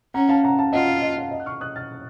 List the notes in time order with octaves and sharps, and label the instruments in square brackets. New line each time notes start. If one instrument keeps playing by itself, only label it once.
[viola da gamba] C#4 [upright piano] F#5 A#5
[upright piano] F5 A5
F#5 A#5
F5 A5
[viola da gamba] F4 [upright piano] D#5 F#5
[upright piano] F5
D#5
F5
D#5 F#5
F#6
C#6 F6
D#6 F#6
F6 A6